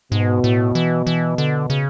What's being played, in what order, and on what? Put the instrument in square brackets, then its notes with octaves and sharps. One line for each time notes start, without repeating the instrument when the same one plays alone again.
[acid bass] G#2 [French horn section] B2
[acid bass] A2
E3
E3
D3
C#3